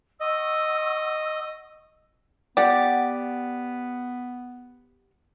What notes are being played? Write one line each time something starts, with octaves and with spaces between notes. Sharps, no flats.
D#5 F#5 C#6 E6
B3 G4 D5 F#5